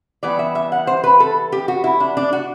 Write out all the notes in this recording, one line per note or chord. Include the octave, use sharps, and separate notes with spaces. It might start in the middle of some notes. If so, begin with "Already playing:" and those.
E3 G3 B3 D5
E5
E5
F#5
C5
B4
A4
G4
F#4
E4
D4
D4
F#4